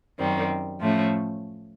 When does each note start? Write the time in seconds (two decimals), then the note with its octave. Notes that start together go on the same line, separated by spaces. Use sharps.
0.19 F#2 D#3 G3 C4
0.81 A2 F3 A3 C#4